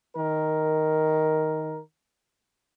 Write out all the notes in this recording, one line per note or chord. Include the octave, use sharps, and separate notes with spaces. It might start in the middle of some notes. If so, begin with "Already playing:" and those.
D#3 A#4